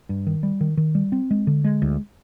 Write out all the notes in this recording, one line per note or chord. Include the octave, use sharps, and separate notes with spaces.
G2
D#3
G3
D#3
D#3
G3
C4
G#3
D3
G#3
D2